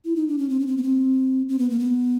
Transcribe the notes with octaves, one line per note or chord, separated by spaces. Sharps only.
E4
D#4
D4
C#4
C4
C#4
C4
B3
C4
C4
B3
A#3
B3